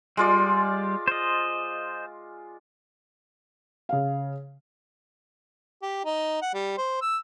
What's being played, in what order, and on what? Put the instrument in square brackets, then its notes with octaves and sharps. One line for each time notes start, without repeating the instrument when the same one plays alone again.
[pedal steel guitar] G3 [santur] G#3 F4 D5
[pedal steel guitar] C5 D#5
[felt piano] C#3 F5
[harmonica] G4
D#4
F#5
G3
C5
E6